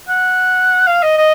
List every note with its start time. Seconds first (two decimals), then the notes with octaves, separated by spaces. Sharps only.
0.09 F#5
0.87 F5
1.02 D#5
1.18 D#5